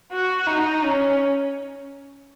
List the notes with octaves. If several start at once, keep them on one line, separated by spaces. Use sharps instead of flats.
F#4
D#4
C#4